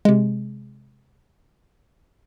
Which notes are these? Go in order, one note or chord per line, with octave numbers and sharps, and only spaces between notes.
C3 G#3